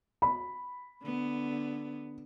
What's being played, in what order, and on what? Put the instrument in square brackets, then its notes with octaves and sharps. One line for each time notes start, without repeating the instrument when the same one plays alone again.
[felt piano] B5
[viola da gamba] D3 B3